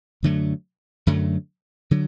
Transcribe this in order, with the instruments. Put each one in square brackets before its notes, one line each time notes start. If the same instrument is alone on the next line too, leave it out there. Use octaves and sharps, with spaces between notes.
[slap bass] F#2 D3 F#3 A3
F#2 D3 F#3 A3
D3 F#3